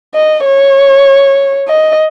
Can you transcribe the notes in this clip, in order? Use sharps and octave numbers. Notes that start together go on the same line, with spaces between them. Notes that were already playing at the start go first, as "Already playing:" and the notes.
D#5
C#5
D#5